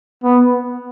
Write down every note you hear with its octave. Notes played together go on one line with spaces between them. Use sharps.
B3